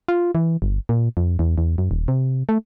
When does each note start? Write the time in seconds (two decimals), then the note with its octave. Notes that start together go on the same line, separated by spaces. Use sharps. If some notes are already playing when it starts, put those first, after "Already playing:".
0.08 F4
0.35 E3
0.62 G1
0.89 A#2
1.17 F2
1.39 E2
1.58 E2
1.78 F#2
1.91 D#1
2.08 C3
2.49 A3